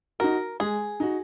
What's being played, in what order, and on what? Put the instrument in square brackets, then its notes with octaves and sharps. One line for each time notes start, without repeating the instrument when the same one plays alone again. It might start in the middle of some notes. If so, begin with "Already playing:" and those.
[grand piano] D#4 F#4 [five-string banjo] A#4
[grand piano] G#3 [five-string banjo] G#4
[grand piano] D#4 F#4